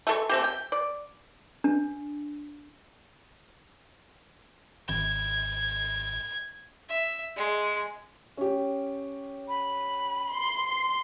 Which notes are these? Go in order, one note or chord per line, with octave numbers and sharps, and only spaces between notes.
A3 A4 C#6
A3 C4 G4
G5
D5
D4
G#1 G#6
E5
G#3
C#4 G4
B5
C6